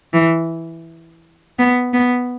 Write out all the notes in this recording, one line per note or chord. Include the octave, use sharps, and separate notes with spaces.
E3
B3
B3